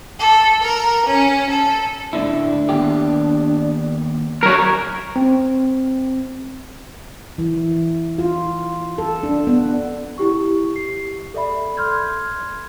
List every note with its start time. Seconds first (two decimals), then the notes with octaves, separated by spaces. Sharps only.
0.19 A4
0.62 A#4
1.06 C#4
1.51 A4
2.13 A2 D3 D4 E4
2.69 D#2 B3 G4
4.43 F#3 A#4 C#5
5.16 C4
7.38 E3
8.18 F4
8.98 A4
9.23 D4
9.47 B3
10.18 E4 G4 C#6
10.76 C7
11.34 A4 D5 E5 B5
11.77 C6 F6 G6 G#6